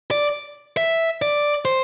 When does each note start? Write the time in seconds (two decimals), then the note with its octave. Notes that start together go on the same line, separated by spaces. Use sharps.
0.11 D5
0.77 E5
1.22 D5
1.65 C5